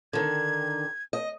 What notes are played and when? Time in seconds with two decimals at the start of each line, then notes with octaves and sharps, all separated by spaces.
0.13 D3 D#3 G#6
1.13 D#5